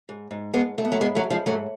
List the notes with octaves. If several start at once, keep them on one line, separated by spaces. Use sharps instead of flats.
G#2
G#2
G#2 G#3 B3
G#2 A3
B3
F#3 A3
G#2 G#3 B3
F#3 A3
G#2
F3 G#3
G#2 F#3 A3